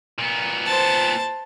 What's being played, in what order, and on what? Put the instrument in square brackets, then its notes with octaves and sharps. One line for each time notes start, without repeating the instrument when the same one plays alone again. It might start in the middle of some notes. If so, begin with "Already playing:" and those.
[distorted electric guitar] A#2 B3
[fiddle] C5 A5